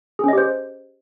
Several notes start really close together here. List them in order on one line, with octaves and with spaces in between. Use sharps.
G#4 C#4 D#5 G4 C5